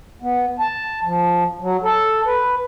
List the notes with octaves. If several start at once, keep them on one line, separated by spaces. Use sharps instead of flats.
B3
A5
F3
F#3
A4
B4